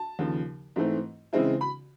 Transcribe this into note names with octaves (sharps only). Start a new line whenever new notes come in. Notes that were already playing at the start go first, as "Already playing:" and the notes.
Already playing: A5
D#2 C#3 F3
G#2 E3 A3 C4
C#3 E3 G#3 C4 E4
B5